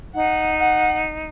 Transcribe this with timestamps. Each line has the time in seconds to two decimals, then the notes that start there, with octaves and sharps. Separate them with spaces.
0.15 D#4 F#5
0.60 F#5